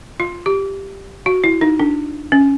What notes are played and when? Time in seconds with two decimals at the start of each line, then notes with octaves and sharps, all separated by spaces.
0.20 F4
0.46 G4
1.26 F#4
1.44 E4
1.61 D#4
1.80 D4
2.32 C#4